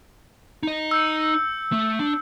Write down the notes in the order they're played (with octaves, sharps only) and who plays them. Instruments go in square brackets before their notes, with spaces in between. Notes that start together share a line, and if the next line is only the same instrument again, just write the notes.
[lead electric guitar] D#4 D#5
[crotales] E6 G6 C#7
[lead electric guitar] A3
D4